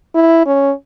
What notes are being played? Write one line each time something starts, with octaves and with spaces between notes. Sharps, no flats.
E4
C#4